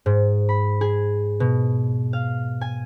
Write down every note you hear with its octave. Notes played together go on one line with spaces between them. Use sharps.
G#2
B5
G#4
B2
F5
G#5